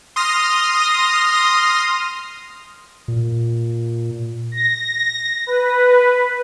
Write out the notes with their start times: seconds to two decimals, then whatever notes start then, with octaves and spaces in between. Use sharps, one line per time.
0.16 C6 D#6 F6 A#6
3.08 A#2
4.52 A#6
5.47 B4